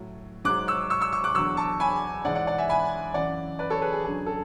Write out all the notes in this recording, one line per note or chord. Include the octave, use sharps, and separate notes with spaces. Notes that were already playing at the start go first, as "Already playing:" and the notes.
Already playing: A2 F#3
G#2 F#3 D6 F#6
C#6 E6
C#6 E6
C#6 E6
C#6 E6
D6 F#6
E2 D3 F#3 C#6 E6
A5 C#6
G#5 B5
G#2 E3 D5 F#5
D5 F#5
D5 F#5
E5 G#5
G#5 B5
F#2 C#3 E3 D5 F#5
B4 D5
A4 C#5
G#4 B4
G#4
F#2 D3 F#3 G#4
A4